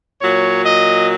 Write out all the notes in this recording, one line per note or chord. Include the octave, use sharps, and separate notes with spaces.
A#2 F#3 C#5
D#5